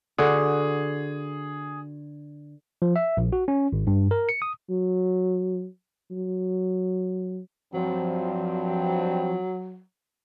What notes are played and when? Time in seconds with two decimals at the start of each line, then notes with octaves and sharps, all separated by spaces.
0.18 D3 F#4 G#4
2.82 F3
2.96 E5
3.17 A#1
3.33 F#4
3.48 C#4
3.72 G#1
3.87 G2
4.11 A#4
4.29 C#7
4.42 D#6
4.70 F#3
6.11 F#3
7.74 G2 F3 F#3 C4